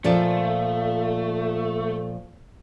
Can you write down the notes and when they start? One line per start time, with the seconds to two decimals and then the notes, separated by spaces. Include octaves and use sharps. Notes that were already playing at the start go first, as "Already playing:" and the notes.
0.04 A#2 F3 A3 D5